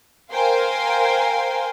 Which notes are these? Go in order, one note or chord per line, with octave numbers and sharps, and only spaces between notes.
A#4 C5 F5 G5 G#5 C6